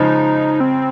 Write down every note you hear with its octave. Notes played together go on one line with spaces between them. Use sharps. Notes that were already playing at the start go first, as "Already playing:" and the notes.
Already playing: C#3 F3 G#3 D#4
C4